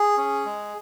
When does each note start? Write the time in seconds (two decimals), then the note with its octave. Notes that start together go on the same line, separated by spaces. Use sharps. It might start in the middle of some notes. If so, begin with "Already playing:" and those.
Already playing: G#4
0.18 C#4
0.45 G#3